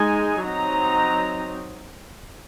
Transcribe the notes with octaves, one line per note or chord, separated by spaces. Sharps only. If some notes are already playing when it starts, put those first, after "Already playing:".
Already playing: G#3 D#4 G#5
F#3 C4 D#4 A#5